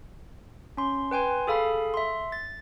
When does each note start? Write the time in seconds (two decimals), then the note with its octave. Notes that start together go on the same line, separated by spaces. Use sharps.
0.77 C#4 C6
1.11 B4 G5 G#5 C6
1.47 G#4 A4 F5 B5
1.94 E5 C6
2.32 A6